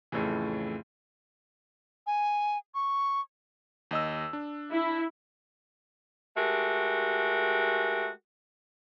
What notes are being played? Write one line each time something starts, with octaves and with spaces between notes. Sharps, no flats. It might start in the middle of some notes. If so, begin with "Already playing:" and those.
F2 A2 C#3 E3
G#5
C#6
D#2 D#5 E6
D4
E4
G#3 A3 F#4 G4 A#4